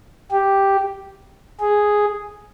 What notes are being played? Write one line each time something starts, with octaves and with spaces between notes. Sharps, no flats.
G4
G#4